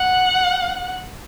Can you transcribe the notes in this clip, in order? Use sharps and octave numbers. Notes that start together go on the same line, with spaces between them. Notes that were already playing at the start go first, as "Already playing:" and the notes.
Already playing: F#5